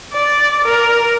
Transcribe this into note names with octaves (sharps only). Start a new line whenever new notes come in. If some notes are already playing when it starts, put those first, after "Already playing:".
D5
A#4